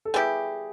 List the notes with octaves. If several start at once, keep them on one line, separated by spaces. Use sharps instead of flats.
A4
G3 B3 E4 G4 G#4